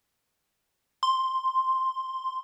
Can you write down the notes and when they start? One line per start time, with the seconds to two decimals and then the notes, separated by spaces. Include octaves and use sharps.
1.03 C6